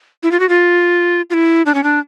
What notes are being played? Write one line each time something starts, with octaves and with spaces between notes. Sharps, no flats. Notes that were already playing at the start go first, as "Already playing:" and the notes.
E4
F4
F#4
F4
F4
E4
D4
C#4
D4